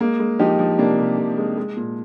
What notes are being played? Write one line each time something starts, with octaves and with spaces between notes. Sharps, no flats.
G#3 A#3
G#3
F3 D#4 G4
F3
C3 A#3 D4
C3
C3
G#3
G#3
A#2